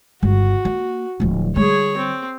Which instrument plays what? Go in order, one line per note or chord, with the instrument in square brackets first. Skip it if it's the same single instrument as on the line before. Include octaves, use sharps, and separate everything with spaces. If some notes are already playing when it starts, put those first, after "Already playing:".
[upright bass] G1 C#3 [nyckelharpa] F#4
[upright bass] A#3
D1 F3
[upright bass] D3 G3 [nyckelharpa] G#4 C#5
[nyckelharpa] C4